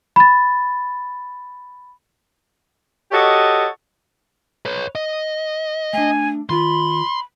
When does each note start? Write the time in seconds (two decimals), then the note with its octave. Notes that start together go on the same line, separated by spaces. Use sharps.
0.16 B5 A6
3.12 F#4 G4 A4 C#5 D#5
4.65 B4 C#5
4.95 D#5
5.93 A3 D4 G#5
6.49 D#3 F4 B5 C6